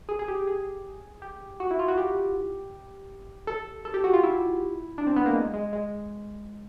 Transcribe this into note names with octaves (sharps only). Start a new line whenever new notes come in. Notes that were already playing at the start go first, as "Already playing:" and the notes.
G#4
G#4
G4
G#4
G4
F#4
E4
F4
F#4
G4
A4
A4
G4
F#4
F4
E4
D4
C4
B3
A#3
G#3
G#3
G#3